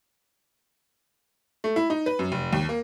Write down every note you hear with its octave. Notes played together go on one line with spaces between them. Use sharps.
A3
E4
D#4
B4
F#2
F1
D#2
A#3